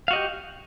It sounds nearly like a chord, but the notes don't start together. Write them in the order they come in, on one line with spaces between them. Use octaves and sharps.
F5 F#4 D#5 G4